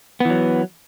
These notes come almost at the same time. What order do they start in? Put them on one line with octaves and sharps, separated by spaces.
B3 E3 F#3